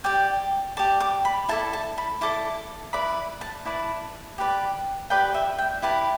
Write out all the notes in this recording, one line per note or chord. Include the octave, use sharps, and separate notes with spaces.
G4 D5 G5
G4 D5 A5
D6
B5
E4 A4 D5 A5
A5
B5
E4 A4 D5 D6
E4 B4 D5 B5
A5
E4 B4 D5 A5
G4 B4 D5
G4 B4 D5 G5
E5
G5
E4 G4 B4 A5